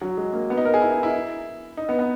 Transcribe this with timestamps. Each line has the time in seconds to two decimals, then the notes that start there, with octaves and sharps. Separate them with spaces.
0.02 F#3
0.17 G#3
0.33 A#3
0.50 B3
0.57 D#4
0.65 A#4
0.74 G#4
0.82 E4
0.92 D#4
1.03 E4
1.77 D#4
1.89 B3
1.99 B3